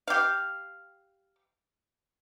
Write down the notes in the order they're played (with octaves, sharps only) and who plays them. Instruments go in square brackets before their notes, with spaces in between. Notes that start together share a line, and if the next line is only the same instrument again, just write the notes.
[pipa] G4 F5